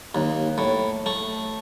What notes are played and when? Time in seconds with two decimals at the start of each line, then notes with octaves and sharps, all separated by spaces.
0.15 D#2
0.58 A2
1.06 A3